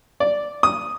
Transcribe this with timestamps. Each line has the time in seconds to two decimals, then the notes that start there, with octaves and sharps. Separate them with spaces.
0.20 D5
0.63 D#6